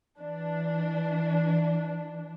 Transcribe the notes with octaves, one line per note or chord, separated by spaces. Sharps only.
E3 D4